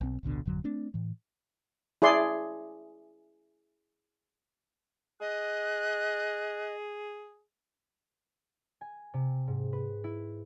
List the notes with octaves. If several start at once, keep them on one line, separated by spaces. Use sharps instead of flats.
B1 C4
A1 D2 B2 D3
G#1 F2 D3 F#3
A3 C4 D4
A2 E3
E4 G#4 D5 C6
G#4 D#5 F#6
G#5
C3
G#2
B4
E4